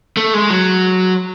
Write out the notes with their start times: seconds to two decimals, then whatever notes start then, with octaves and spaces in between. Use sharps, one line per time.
0.17 A3
0.34 G#3
0.50 F#3